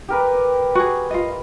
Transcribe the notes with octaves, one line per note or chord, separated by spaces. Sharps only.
G4 A#4 B4
F#4 G#4
F4 D#5